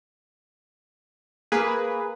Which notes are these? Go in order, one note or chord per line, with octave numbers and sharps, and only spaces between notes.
A#3 G#4 B4